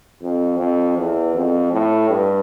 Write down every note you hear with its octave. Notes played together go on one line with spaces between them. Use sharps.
F2
F2
E2
F2
A2
G2